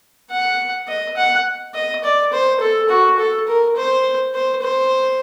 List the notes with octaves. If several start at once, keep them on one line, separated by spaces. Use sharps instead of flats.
F#5
D#5
F#5
D#5
D5
C5
A4
F#4
A4
A#4
C5
C5
C5